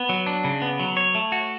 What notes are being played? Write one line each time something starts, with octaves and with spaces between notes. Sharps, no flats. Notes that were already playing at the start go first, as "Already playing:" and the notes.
Already playing: B3
F#3
D4
C#3
B3
F#3
C#5
A3
F#4